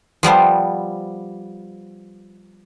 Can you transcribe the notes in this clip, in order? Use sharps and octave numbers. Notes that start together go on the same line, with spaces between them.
F3 G3 B3 C5